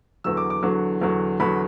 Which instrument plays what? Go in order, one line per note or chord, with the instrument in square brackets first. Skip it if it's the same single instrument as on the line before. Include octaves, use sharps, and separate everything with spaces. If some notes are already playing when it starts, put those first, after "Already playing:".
[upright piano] E2 D3 F#3 E6
D6
D6
E2 D3 F#3
E2 D3 F#3
E2 D3 F#3 B5